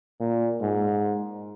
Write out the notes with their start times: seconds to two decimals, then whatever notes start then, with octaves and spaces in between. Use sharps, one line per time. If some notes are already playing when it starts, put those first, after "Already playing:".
0.20 A#2
0.62 G#2